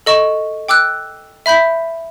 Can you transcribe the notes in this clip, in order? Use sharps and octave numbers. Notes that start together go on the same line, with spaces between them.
A4 D#5 C#6 E7
G5 D6 E6 F#6
E5 B5 G6 B6